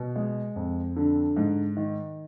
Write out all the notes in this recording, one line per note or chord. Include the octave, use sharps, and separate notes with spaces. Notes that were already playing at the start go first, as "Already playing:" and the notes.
Already playing: B2
G#3
F2
D3
G#2
D#3